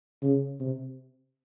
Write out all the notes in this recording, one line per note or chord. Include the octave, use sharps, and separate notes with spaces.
C#3
C3